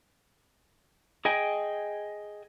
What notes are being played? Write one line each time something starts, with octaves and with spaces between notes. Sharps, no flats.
G#4 D#5 G5 G#5